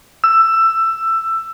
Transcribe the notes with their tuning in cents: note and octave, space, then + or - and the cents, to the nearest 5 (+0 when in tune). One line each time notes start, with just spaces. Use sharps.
E6 +15